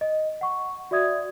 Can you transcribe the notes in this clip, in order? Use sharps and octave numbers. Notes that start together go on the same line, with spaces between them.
D#5
F#5 C#6
F#4 D5 E5 D#6 G#6